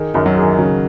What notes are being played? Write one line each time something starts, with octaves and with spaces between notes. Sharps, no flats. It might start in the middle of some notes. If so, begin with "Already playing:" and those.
Already playing: D#3 G#4
F#2 D#3
F#3
G#4
D#3
C#3 F#3